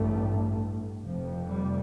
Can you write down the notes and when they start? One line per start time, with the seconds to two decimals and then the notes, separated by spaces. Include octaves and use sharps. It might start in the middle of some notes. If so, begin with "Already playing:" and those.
Already playing: A1 G2 A3
1.03 F1 F2 C3 F3
1.48 G3